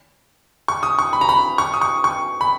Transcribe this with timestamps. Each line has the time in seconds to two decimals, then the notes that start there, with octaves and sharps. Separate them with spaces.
0.68 C#6
0.83 D#6
0.99 C#6
1.13 B5
1.21 A#5
1.29 B5
1.58 C#6
1.74 D#6
1.81 C#6
2.04 C#6
2.41 B5